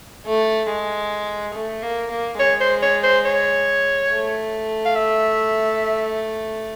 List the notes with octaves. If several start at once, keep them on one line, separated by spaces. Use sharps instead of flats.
A3
G#3
A3
A#3
A#3
G#3 C#5
C5
C#5
C5
C#5
A3
F5
E5